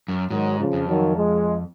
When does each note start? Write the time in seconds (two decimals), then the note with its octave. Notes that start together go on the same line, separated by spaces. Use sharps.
0.08 F#2
0.30 G#2 D#3 F#3
0.59 C#3 F3
0.73 F2
0.87 D#3 F#3
1.15 F3 G#3